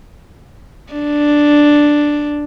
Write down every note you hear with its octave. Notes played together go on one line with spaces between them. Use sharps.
D4